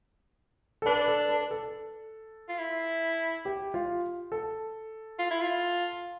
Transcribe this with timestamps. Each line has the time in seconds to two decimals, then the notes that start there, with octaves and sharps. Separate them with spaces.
0.82 A4
0.86 D4 B4
1.08 A4
1.29 B4
1.51 A4
2.49 F4
2.59 E4
3.45 G4
3.74 F4
4.32 A4
5.19 F4
5.30 E4
5.41 F4